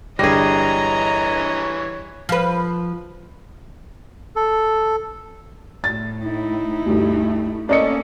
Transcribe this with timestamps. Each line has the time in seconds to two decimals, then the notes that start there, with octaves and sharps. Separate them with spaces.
0.19 G1 E3 G3 G#4 C#5 D#5 A#5 A#6
2.29 F3 B4
4.36 A4
5.84 A2 A6
6.24 D#4 E4
6.86 D2 G2 A3
7.69 A#3 C#4 A4 D5 D#5 C#7